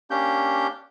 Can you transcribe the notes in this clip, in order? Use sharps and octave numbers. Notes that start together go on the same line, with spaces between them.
A#3 C#4 D4 G4 G6